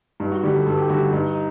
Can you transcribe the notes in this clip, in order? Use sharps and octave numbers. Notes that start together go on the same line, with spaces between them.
G2 D#4
F#4
D3 G3 G4
A4
G2 A4
G4
D3 G3 F#4
G2 D#4
D#4